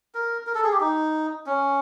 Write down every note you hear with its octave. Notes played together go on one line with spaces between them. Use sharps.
A#4
A#4
A4
G#4
G4
D#4
C#4